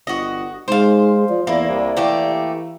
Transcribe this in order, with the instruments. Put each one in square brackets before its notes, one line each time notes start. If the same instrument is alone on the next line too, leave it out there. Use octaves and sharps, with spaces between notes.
[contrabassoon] G1 [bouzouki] F#4 D#5
[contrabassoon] G#2 [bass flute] G#3 [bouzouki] C5 F5
[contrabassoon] F3 [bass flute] D5
[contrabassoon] E2 [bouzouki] A#3 E4 [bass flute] D5
[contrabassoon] C2
[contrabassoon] E3 [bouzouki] A3 A#3 G4